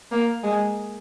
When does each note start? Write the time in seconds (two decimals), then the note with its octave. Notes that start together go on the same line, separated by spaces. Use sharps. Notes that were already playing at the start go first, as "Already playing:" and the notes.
0.11 A#3
0.43 G#3